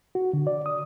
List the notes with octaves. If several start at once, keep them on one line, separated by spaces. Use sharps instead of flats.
F#4
D3
D5
D#6